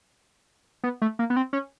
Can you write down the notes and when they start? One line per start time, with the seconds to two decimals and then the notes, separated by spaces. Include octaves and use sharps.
0.84 B3
1.02 A3
1.19 A#3
1.30 B3
1.36 C4
1.53 C#4